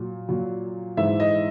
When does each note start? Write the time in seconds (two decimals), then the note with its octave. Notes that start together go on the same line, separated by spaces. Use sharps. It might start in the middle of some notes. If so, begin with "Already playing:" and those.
Already playing: A#2 F#3
0.29 A#2 F#3
0.97 G#2 E3 E5
1.20 D#5